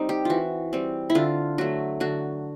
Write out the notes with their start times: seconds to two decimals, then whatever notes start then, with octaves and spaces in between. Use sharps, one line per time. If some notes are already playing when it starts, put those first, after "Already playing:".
Already playing: G3 C4 D#4
0.09 G4
0.25 E3 F4 F#4
0.73 G3 C4
1.10 E4
1.15 D3 F4
1.58 F#3 A3 F#4
2.00 D3 F#4